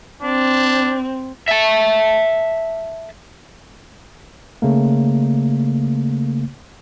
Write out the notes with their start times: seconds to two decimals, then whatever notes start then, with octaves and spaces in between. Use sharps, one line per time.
0.23 C4 D4
1.49 E5 A5
4.62 C#3 A3 A#3